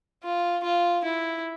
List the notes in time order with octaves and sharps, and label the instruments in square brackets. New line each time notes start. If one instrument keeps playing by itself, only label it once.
[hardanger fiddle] F4
F4
E4